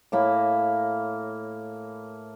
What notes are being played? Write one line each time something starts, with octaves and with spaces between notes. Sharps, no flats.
A2 A#3 B5